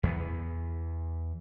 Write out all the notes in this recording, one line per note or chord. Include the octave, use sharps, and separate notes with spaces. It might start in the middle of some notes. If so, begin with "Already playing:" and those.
E2 E3 G#3 B3